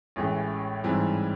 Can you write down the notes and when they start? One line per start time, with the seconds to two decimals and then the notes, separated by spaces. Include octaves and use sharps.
0.16 A1 A2 E3 G#3 C#4
0.84 G#2 E3 G3 C4 E4